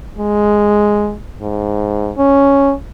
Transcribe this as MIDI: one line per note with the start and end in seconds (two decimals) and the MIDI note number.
0.18 1.15 56
1.41 2.12 44
2.17 2.73 61